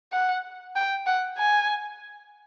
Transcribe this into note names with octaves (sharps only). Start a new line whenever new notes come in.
F#5
G5
F#5
G#5